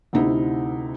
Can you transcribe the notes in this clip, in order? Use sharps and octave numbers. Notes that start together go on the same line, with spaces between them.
D2 C3 D#4 E4